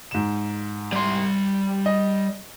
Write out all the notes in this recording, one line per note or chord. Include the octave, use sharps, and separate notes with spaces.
G#2 E7
G3 C6
D#5